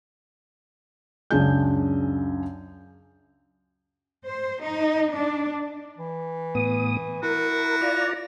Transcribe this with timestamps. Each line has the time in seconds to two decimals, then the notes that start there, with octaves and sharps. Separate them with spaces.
1.31 C#2 F#2 D4 G#4 G#5 G6
4.26 C5
4.62 D#4
5.14 D4
5.98 E3
6.55 A2 B3 D#6
7.23 E4 F#4 A#4
7.81 F4 D5 A#5